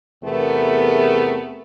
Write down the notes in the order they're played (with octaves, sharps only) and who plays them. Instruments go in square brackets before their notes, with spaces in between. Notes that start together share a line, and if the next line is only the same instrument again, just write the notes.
[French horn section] E2 C3 A3 B3 G#4 A#4